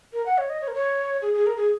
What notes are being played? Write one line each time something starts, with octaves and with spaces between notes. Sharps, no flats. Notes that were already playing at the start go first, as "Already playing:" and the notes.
A#4
F#5
C#5
D#5
C#5
A#4
C#5
G#4
G#4
A#4
G#4